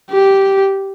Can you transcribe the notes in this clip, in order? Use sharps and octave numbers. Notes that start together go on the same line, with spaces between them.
G4